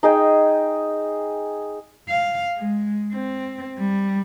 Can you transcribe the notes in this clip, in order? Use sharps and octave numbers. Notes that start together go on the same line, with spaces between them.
D#4 G#4 G5
F5
G#3
C4
G3